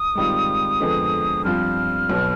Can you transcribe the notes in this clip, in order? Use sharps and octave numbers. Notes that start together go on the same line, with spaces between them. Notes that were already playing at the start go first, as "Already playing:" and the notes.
Already playing: D#6
G#2 D#3 G3 C4 F4
F2 D3 G#3 B3
G2 F3 C4 F4 F6
B1 B2 B3